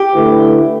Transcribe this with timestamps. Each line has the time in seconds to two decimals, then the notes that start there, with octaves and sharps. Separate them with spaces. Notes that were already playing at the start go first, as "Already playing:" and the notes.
Already playing: G4
0.14 D3 A3 E4 B4